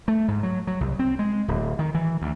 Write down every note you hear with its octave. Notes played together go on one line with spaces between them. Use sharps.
A3
G#2
F#3
F#3
C2
C4
G#3
D1
D#3
E3
D2